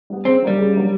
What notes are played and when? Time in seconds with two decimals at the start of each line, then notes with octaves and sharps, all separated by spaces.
0.10 G3 B3
0.25 C#3 C4
0.42 F#3 G3 A#3 D4
0.58 C#3
0.74 F#3 A#3 D4